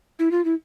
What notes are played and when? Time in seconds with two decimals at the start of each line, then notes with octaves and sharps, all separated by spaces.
0.19 E4
0.31 F4
0.45 E4